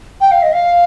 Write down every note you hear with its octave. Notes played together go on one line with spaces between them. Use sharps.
G5
F5
D#5
F5